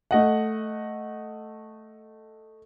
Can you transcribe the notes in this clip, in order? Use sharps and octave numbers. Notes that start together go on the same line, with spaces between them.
A3 D#5 F#5